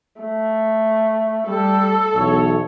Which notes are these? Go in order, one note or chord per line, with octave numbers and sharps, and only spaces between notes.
A3
G3 A4
B1 E2 C#5